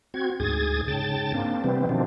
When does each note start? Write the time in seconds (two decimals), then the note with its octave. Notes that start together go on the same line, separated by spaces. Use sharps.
0.14 C4 F#4 G#6
0.40 D2 G#2 G#4 D#6 G#6 A6
0.88 G#2 C#3 G5 A5 A6
1.34 A#3 C4 D4
1.64 C3 E3 G3 B3 C4
1.89 B2 D#3 F3 C4 D4